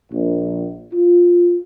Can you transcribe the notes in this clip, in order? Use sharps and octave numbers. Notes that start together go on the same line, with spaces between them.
A#1
F4